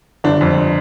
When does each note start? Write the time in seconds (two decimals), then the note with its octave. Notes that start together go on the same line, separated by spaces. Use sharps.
0.24 G1 D4
0.41 F2